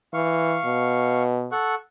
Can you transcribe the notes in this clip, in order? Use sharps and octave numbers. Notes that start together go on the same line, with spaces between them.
E3 F5 C#6
B2
A4 F#5 C#6